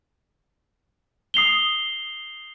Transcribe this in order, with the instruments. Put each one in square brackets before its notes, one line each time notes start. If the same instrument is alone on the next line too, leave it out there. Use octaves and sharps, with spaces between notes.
[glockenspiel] D#6 C7 F7 G7